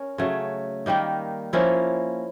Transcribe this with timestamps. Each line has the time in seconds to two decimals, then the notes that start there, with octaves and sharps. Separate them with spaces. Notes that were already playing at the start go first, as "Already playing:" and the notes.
Already playing: C#4 A#4
0.18 C#3 F#3 A3
0.86 D#3 G3 A#3 D#4
1.53 F3 A#3 C#4 E4